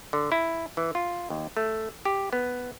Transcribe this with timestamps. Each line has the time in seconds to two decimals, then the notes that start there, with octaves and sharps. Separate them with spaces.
0.13 D3
0.32 E4
0.77 E3
0.95 F4
1.30 D#2
1.57 A3
2.05 G4
2.33 B3